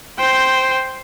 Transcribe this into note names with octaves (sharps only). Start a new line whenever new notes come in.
C5 G5